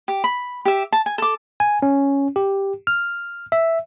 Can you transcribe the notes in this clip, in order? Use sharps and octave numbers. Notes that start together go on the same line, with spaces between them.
G4
B5
G4 E5
A5
G#5
A4 D6
G#5
C#4
G4
F6
E5